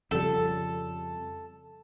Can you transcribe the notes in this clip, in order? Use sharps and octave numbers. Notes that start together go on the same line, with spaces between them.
F2 C#3 G3 A4